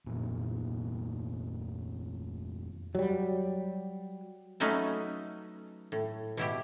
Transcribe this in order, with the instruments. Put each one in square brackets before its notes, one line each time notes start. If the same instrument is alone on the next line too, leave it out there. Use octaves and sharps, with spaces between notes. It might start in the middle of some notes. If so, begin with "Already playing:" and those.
[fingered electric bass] F1 A#2
[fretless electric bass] F#3 G3
[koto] F#3 A3 C#4 D#4 B4 D#5
A2
B2 E4 G4